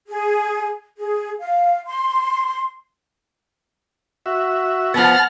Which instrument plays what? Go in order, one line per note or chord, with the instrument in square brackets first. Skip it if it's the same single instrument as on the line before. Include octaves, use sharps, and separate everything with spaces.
[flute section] G#4
G#4
F5
C6
[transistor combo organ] F#4 E5
[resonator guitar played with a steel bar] F3 B3 [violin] F#5 F6 [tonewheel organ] A5